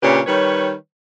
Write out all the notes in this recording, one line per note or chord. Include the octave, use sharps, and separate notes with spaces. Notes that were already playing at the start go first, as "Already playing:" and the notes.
A#2 C#3 D4 G4 B4 C#5
D#3 G3 B4 C#5